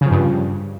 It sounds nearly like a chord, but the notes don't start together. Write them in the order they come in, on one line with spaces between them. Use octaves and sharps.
C#3 F3 G2